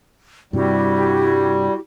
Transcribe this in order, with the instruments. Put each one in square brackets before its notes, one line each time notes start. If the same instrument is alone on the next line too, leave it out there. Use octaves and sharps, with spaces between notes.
[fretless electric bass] G2 C3 [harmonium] G3 [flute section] E4 F#4 G4